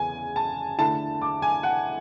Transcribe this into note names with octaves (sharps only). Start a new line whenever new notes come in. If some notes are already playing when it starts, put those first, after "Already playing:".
Already playing: E2 C#3 E3 G#5
A5
D3 A3 E4 A5
D6
G#5
F#5